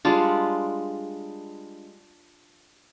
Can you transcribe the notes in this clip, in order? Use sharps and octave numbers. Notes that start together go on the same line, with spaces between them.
G3 G#3 D4 F4